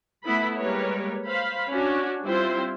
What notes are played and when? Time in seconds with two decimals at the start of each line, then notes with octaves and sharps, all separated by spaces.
0.25 A3 B3 E4 B5
0.58 G3 G#3 A#3 A#4 B4 C#5
1.27 C5 F5 B5
1.70 C#4 D4 F#4
2.24 G3 C4 E4 F4 C5